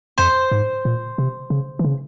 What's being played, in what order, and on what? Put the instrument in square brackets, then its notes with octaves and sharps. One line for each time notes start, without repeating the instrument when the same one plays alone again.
[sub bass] F2 [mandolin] C5
[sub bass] G#2
A#2
C3
C#3
E3
C#3